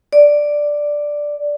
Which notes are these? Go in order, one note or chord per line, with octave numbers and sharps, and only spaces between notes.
D5